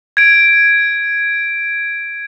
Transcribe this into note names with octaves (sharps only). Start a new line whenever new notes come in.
G#6 D7